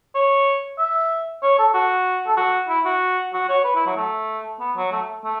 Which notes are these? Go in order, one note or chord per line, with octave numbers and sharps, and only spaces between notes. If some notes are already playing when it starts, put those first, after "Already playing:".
C#5
E5
C#5
A4
F#4
A4
F#4
E4
F#4
F#4
C#5
B4
E4
F#3
A3
B3
F#3
A3
A3